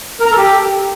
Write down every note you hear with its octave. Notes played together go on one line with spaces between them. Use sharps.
A#4
A#5
A4
G4